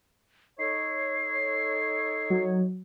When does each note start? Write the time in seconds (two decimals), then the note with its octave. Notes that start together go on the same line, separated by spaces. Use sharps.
0.59 D#4 A4 C#5 C7
2.30 F#3